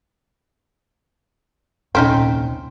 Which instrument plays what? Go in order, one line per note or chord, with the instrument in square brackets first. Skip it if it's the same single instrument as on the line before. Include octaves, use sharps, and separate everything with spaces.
[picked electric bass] D#1 C2 [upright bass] A#2 [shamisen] C4 C#4 D#4